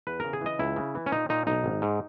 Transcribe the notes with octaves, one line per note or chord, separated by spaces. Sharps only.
E2 B4
C#3 A#4
G#4
E3 D#5
C#2 E4
C#3
E3
C#4
A#2 D#4
A#2 D#4
B1 D#4
G#1
G#2